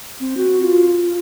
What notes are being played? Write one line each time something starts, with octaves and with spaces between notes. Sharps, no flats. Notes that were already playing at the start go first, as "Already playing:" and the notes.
C4
F#4
F4